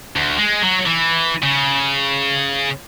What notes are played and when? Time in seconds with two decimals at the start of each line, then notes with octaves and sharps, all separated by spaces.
0.16 D2
0.38 G#3
0.62 F#3
0.86 E3
1.42 C#3